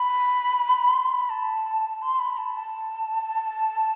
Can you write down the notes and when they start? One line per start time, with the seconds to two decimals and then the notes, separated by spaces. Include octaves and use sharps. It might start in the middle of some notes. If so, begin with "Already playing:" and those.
Already playing: B5
0.94 C6
1.12 B5
1.30 A5
2.02 C6
2.19 B5
2.37 A5
2.55 A5